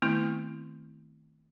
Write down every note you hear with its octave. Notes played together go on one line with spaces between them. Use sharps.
D#3 A3 B3 C4 E4